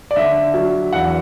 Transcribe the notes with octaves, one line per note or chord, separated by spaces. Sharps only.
D5
D3 E5
F#3
E2 F#5